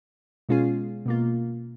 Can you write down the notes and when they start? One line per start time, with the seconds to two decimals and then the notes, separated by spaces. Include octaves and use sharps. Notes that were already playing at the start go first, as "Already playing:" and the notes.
0.49 B2 G#3 C#4 F4 G#4
1.06 B2 A#3 F4